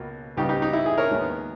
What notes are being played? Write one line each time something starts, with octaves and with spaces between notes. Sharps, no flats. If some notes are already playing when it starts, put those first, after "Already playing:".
Already playing: C#2 B2 A#3
C#2 C#3 G3 B3 D#4 G4
D#4 G4
D#4
E4
E4 G#4
A#4 C#5
D#2 D#3 G#3 B3